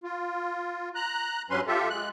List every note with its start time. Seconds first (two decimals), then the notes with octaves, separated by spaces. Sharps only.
0.04 F4
0.95 A#5 F#6
1.50 G2 F#3 C#4 B4 C6
1.67 F4 G4 A4 E5
1.90 G#3 F#6